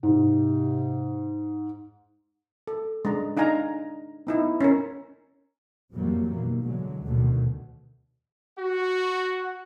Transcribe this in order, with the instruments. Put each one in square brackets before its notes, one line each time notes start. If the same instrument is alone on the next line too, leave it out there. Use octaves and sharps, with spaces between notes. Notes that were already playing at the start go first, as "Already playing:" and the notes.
[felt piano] G#2 [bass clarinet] C3
[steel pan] A4
G#3 D4 A#5
D4 D#4 F5 G#5 A#5
B3 D#4 E4
C#4 A#4
[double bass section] F2 C3 E3 F#3 G3 A#3
B2 D#3 E3 A#3
D3 E3 F#3 G#3
D2 B2 D3 D#3 F#3 A3
[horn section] F#4